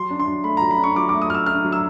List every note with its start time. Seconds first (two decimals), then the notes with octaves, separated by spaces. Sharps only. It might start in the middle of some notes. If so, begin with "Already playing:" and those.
Already playing: F#3 C6
0.11 D4
0.19 C6
0.28 F#3
0.44 A3 B5
0.57 F#3 A#5
0.71 B5
0.79 D4 C#6
0.96 F#3 D6
1.09 A3 D6
1.22 D#6
1.30 F#3 E6 F6
1.46 D4 F6
1.65 F#3
1.72 E6